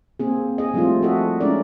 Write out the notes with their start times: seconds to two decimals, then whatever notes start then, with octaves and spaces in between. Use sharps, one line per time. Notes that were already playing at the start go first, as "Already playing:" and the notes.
0.19 A#3 C4 G#4
0.58 G#4 D#5
0.74 F3 G3 A3 C4 E4 F4
1.03 F#4 A4 D#5 E5
1.40 G#3 C#4 D4 E4 A#4 D5